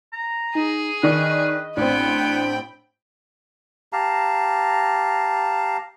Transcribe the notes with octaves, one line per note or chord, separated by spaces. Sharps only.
A#5
D#4 G#4
D#3 D4 B4 D#5 C#6
A1 B3 C4 D4 G5 B5
G4 F5 A5 A#5